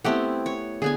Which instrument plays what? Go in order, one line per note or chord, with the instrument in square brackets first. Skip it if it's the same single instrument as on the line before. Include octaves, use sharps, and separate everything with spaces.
[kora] A3 G4 F#5 [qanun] B3 C4 E4
[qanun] C#5
[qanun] D3 B3 G#5 [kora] G#4